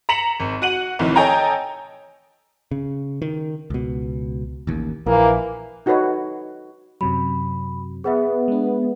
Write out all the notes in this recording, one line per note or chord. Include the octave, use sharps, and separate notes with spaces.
A#5 B6 C#7 E7 F#7
G#1
F#4 F#5 D#7 F#7
C2 A2 D#3 E3
A4 C#5 D#5 G5 G#5 A#5
C#3
D#3
C#2 B2
A1 D#2
A#1 E3 A#3
D#4 F#4 A4 B4 C#5 D#5
F#2 C3 F#3 B5
B3 G#4 B4 E5
G#3 D4